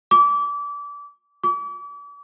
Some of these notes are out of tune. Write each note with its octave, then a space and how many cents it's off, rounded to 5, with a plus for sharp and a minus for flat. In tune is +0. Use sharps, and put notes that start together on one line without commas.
D6 -30
D6 -40